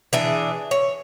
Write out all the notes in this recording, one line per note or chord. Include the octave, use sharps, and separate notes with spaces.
E3 D4 G#4
C#5